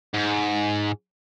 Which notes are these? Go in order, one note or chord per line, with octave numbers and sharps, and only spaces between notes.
G#2